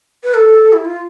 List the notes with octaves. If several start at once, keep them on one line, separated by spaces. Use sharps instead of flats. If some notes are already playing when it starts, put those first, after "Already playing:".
B4
A4
E4
F4